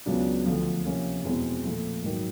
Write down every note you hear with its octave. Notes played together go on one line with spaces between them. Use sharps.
C#2 C#3 F#3 B3 D4
D2 D3 F3
C3 F3 A#3 C#4
E2 B2 G#3 C4
A#2 F3 A3
G#2 D#3 F#3